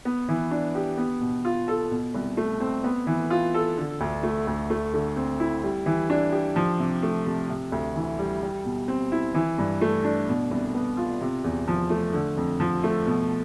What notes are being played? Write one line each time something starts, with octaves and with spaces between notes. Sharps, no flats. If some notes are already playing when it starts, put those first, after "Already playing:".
B3
E3
D4
G4
B3
B2
F4
A4
B2
C2
A3
C4
B3
E3
F4
A4
D3
D2
A3
D2
A3
D3
C4
E4
G3
E3
D4
G4
F3
C3
A3
C3
C3
D2
E3
G3
G3
B2
C4
E4
E3
G2
A3
D4
B2
C2
B3
F4
C3
E2
F3
A3
D3
F2
F3
A3
B2